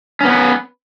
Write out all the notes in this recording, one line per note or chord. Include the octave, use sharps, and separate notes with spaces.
B3 C#4 B4